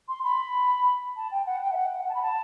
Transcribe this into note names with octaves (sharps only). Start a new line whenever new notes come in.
C6
B5
A5
G5
F#5
G5
E5
F#5
F#5
A5
B5
A5